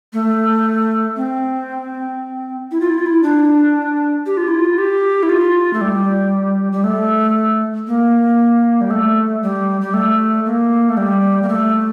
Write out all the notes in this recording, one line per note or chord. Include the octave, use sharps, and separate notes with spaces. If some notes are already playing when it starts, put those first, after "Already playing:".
A3
C4
E4
F4
E4
F4
E4
D4
G4
F4
E4
F4
G4
E4
F4
A3
G3
G3
A3
A#3
G3
A3
G3
G3
A3
A#3
A3
G3
A#3
A3